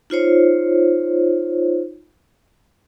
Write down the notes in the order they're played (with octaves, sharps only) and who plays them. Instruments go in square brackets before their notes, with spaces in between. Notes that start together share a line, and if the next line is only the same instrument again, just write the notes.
[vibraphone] D#4 F4 C5 C#5